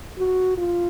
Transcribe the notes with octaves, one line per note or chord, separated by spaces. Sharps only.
F#4
F4